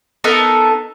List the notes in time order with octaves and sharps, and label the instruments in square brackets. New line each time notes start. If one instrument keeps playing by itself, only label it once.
[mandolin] B3 D#4 A4 A#4